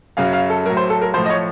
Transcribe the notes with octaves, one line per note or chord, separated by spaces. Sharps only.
F#2 C#3 F#3 F5
F5
A4
A2 F#3 A#4
C5
A4
A#4
A2 F3 C5
D#5
C#5